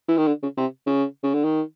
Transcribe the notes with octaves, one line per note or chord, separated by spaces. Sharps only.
E3
D#3
D3
C#3
C3
C#3
C#3
D3
D#3